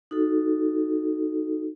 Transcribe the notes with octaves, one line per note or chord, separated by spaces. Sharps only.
D#4 F#4 A4